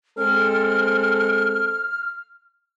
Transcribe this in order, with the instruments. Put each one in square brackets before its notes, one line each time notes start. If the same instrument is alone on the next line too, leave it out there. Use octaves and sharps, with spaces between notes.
[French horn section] G#3 C4 A4 [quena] F6